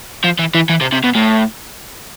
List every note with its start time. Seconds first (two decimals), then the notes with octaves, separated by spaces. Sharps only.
0.24 F3
0.39 E3
0.55 E3
0.69 E3
0.81 C3
0.93 C3
1.04 B2
1.15 A2